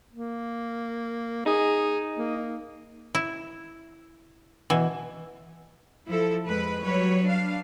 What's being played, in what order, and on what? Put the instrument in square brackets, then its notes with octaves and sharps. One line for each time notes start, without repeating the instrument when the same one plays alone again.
[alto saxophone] A#3
[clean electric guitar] D#4 [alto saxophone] G#4
[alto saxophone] A#3
[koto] E4
B2 E3
[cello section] F3 E4 A4
F2 G#3 B4
F#3 G3 B4 C#5
D4 F5